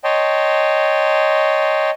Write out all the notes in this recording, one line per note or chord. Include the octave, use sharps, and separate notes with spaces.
C#5 D#5 G5 A5 C6